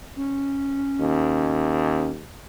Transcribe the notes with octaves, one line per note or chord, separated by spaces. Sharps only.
C#4
D#2